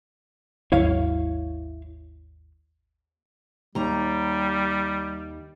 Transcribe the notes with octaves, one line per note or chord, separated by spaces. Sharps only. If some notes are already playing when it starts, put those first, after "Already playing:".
G#1 D#2 F#3 E4 C#5 F5
D#2 G3 A#5